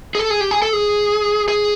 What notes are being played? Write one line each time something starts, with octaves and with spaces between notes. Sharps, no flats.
G#4
A4
G#4
G4
G#4
A4
G#4
G#4